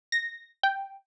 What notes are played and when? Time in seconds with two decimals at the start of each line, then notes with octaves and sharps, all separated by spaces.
0.12 A#6
0.63 G5